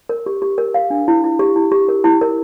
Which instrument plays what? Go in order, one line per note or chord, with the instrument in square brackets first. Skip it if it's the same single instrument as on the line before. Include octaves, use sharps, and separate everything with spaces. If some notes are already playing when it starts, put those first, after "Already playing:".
[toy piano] A#4
G4
G4
A#4
F5
D4
E4
E4
G4
E4
G4
A#4
E4
A#4